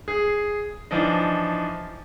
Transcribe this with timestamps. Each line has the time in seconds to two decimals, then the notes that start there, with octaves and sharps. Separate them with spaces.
0.08 G#4
0.91 E3 F3 D4 D#4